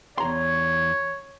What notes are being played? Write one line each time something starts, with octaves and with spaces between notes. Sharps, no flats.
E2 C#5 A#5 C6